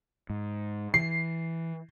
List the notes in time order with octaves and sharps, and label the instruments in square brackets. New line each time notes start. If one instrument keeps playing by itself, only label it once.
[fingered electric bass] G#2
[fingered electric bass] E3 [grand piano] C7